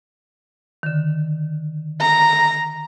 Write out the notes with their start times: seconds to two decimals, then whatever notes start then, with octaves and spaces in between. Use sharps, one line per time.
0.83 D3 D#3
2.01 A#5